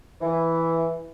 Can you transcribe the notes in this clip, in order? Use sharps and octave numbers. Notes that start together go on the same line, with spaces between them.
E3